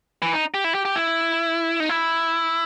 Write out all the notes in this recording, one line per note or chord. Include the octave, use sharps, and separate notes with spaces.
E3
D#4
G4
E4
G4
G4
E4
D#4
E4